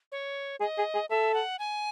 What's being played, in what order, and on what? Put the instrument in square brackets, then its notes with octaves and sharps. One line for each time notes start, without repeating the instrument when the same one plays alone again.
[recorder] C#5
[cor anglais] G#4 [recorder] D#5
[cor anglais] G#4
G#4
[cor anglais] A4 [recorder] E5
[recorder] F#5
G#5